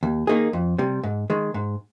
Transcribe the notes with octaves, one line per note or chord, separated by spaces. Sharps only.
D#2
D#3 A#3 D#4 G#4
F2
C3 G3
G#2
D#3 G#3
G#2